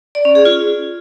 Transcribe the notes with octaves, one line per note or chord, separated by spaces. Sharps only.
D5
C#4
G#4
F4